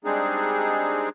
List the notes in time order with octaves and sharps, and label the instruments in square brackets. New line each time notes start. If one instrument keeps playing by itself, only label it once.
[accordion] G3 G#3 C4 D4 D#4 G#4